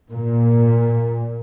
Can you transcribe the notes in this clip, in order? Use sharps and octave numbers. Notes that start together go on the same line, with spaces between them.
A#2